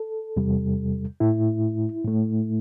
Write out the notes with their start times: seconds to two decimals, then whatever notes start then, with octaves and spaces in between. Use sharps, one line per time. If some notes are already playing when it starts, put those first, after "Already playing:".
Already playing: A4
0.37 E2 C3 G3
1.20 A2 A3 E4
2.04 A2 A3